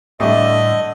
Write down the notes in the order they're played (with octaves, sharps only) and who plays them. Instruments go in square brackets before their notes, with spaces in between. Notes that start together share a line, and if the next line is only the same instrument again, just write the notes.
[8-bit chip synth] A2 G3 [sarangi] D3 [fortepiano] A3 [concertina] D#5